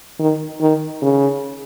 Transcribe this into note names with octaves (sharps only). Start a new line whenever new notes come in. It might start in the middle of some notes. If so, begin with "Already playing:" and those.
D#3
D#3
C#3